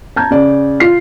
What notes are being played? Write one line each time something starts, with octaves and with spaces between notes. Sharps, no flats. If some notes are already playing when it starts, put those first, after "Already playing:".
A5 A#5 G6 G#6
C#3 D5
F4 C7